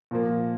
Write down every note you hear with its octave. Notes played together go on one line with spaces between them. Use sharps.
A#2 F3 A#3